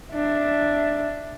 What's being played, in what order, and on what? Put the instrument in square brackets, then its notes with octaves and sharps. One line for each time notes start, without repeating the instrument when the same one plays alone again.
[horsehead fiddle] D4 E5